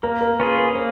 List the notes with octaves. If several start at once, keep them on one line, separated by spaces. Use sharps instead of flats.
A#3 A#4
A#4
C#4 F4 G#4 B4
B4
A#3 C5